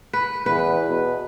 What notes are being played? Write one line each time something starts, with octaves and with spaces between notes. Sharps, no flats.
B4
E2 B4
B2